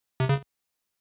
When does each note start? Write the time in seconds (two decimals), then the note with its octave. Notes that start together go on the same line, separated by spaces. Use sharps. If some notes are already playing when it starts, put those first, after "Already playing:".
0.20 C3
0.29 C#3